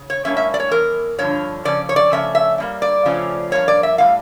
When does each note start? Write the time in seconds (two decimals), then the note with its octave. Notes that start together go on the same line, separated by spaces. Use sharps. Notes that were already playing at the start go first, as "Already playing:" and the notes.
Already playing: C#3
0.10 C#5
0.25 A2 G3 A#3 C#4 E5
0.37 E5
0.54 D5
0.60 C#5
0.71 E2 E3 A#4
1.18 G2 D3 F3 C#5
1.65 C#3 F3 C#4 D5
1.89 C#5
1.96 D5
2.11 C#3 F3 A3 C#4 E5
2.35 E5
2.58 A2 G3 A#3
2.82 D5
3.05 C#3 F3 A3 C#4
3.52 G2 F3 A#3 C#5
3.68 D5
3.83 E5
3.98 A2 E3 G3 F5